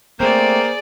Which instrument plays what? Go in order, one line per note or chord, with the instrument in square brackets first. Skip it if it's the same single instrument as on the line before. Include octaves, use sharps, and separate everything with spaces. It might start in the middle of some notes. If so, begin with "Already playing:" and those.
[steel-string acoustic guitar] A3 C4 [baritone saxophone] A#3 [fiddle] G#4 D5 [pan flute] C5